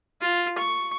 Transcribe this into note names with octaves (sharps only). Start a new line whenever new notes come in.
F4
C#6